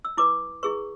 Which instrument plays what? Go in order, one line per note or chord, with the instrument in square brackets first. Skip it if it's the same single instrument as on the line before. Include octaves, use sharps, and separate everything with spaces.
[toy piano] E6
E4 B4 D6
E4 G#4 B4 C#6